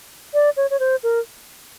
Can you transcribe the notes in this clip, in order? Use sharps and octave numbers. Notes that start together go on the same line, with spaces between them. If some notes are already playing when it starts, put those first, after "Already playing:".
D5
C#5
C#5
C5
A#4